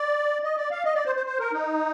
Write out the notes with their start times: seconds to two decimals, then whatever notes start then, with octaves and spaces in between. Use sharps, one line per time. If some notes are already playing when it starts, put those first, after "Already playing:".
Already playing: D5
0.44 D#5
0.57 D5
0.71 F5
0.85 D#5
0.95 D5
1.05 C5
1.16 C5
1.26 C5
1.39 A#4
1.53 D#4